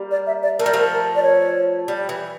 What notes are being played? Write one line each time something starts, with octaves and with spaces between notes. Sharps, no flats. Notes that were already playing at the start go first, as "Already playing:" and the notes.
Already playing: G3 A#3
D5
E5
D5
A3 A#4
G3
F3 A3
D5
C#5
G3
E3